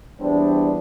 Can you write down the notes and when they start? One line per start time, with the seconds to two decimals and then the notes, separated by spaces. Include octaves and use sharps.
0.20 E2 G3 B3 C4 D4